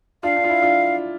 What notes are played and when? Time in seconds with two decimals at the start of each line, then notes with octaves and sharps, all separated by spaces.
0.23 D4 F4 F5
0.36 D4
0.44 F4
0.49 E4
0.62 D4 F4